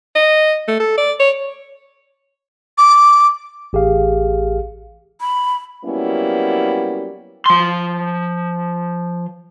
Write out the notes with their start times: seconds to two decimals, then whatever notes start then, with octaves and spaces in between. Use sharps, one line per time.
0.16 D#5
0.68 A3
0.80 A4
0.98 D5
1.20 C#5
2.78 D6
3.73 A1 G4 G#4 F5
5.21 B5
5.84 F#3 G3 A#3 B3 C#4 E4
7.46 F3 C6